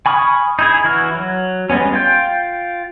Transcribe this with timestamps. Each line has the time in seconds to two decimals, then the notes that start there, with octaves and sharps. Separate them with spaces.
0.06 G#5 B5 C#6 D#6 F6
0.59 D#4 E4 G#4
0.84 E3 E4 F#4 F6
1.15 F#3
1.70 G3 G#3 B3 C#4
1.93 F4 G5